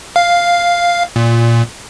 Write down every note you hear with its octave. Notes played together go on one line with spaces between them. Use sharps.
F5
A#2